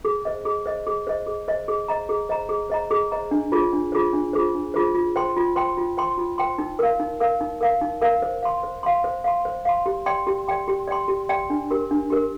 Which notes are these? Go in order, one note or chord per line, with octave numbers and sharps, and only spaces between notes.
G#4
C5 D#5
G#4
C5 D#5
G#4
C5 D#5
G#4
C5 D#5
G#4
C5 D#5 A#5
G#4
C5 D#5 A#5
G#4
C5 D#5 A#5
G#4
C5 D#5 A#5
D4
F4 G#4 C5
D4
F4 G#4 C5
D4
F4 G#4 C5
D4
F4 G#4 C5
F4
C5 G5 C6
F4
C5 G5 C6
F4
C5 G5 C6
F4
C5 G5 C6
D#4
A#4 F5
D#4
A#4 F5
D#4
A#4 F5
D#4
A#4 F5
C5
F5 C6
C5
F5 C6
C5
F5 C6
C5
F5 C6
G4
D5 G5 C6
G4
D5 G5 C6
G4
D5 G5 C6
G4
D5 G5 C6
D4
G4 A#4
D4
G4 A#4